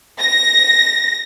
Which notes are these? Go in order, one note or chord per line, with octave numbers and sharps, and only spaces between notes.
A#6